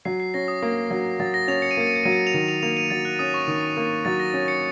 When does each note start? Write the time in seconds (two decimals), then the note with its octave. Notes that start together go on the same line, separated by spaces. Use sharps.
0.05 F#3 C7
0.20 C7
0.34 C#4 A#6
0.48 D#6
0.62 A#3
0.91 F#3
1.20 F#3 A6
1.34 A#6
1.48 C#4 F7
1.62 C#7
1.71 D#7
1.77 A#3 C#7
1.87 D#7
1.96 C#7
2.04 F#3 D#7
2.13 C#7
2.27 F7
2.34 D#3 D#7
2.48 F7
2.62 A#3 F7
2.77 D#7
2.90 F#3 A6
3.05 F#6
3.19 C#4 D#6
3.34 C#6
3.48 D#3 D#6
3.77 A#3
4.05 F#3 A6
4.20 A#6
4.34 C#4
4.48 C#7